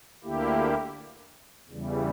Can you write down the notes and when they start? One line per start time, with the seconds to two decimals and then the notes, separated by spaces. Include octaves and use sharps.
0.24 D2 D3 A#3 E4 G4
1.69 E2 C#3 E3 G3